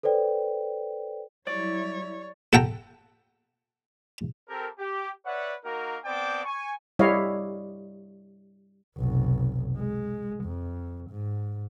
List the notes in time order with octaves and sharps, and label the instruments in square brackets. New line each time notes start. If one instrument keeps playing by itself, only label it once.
[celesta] A4 B4 C5 D5 G5
[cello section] F#3 G3 E4 [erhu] C#5 [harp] D5
[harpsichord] A4 F#5 G5 A#5
[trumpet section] C4 G4 A4 A#4
G4
B4 C#5 D5 E5 F#5
A#3 D#4 F#4 A#4
B3 C4 D5 G5 A5 D6
G#5 C#6
[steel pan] G3 E4 C#5 D#5 F5
[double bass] F1 B1
G#3
F2
G#2